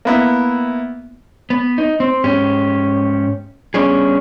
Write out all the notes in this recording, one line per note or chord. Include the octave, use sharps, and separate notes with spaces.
A#3 B3 E4
B3
D#4
C4
G#2 C#4 G4
G3 B3 C#4 D4 G#4